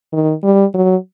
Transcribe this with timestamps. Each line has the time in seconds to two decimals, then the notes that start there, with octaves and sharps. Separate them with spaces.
0.13 D#3
0.43 G3
0.74 F#3